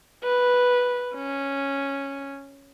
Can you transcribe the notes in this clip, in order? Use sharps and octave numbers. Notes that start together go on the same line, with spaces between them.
B4
C#4